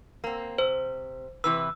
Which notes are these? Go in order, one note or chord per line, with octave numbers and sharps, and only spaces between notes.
A#3 C4
C3 C5
C3 E3 B4 E6